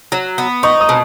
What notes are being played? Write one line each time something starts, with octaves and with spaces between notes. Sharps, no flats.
F#3
B3
D#4 C#6
D#6
B2